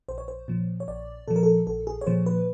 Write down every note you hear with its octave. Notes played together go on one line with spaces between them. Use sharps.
A#1 C5
C#5
C5
A#2 F3
C#5
A#1 D5
A#2 F3 A4
A#4
A4
A#1 A4
G#4
C#5
A#2 F3 C5
B4